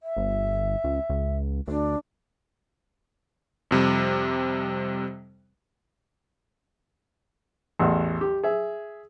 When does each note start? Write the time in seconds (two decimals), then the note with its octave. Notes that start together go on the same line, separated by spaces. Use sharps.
0.03 E5
0.17 G1
0.84 C#2
1.10 C#2
1.68 D2 D4
3.71 F2 C3 G3
7.79 A1 E2 F#5
8.21 G4
8.43 G#4 E5